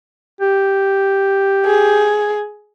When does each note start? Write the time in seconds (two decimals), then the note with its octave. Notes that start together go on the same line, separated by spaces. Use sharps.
0.41 G4
1.65 G#4